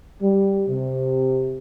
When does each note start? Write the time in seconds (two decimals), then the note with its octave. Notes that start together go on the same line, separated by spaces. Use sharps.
0.21 G3
0.67 C3